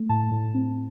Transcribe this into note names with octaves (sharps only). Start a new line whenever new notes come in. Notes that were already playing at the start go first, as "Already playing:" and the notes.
Already playing: A3
A2 A5
A2
C4